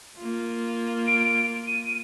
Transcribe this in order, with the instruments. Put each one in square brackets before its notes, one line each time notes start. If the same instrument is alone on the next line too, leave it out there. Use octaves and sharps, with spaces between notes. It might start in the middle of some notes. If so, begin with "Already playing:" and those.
[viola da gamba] A#3 F4
[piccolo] D7
D#7